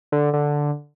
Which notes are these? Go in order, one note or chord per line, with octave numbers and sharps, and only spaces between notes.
D3
D3